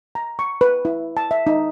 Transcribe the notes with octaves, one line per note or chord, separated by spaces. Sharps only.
A#5
C#6
B4
E4
A5
E5
D#4